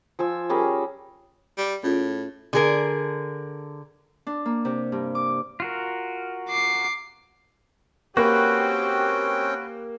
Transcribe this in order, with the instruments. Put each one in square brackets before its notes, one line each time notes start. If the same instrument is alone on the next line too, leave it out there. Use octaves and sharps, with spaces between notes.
[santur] F3 G#5 E6
G3 C#4 G#4 A#4
[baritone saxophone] G3
[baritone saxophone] A2 [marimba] C#4 F4 G#4
[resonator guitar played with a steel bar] D3 G#4 A#4
[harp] D4
A#3
C3
G2
D6
[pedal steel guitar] F4 F#4 A#4
[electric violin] D6 C7
[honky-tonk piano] A#3 [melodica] C4 C#4 G5 [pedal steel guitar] F#4 B4 [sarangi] G4